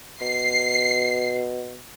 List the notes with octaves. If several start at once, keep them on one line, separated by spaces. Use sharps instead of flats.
B2 C7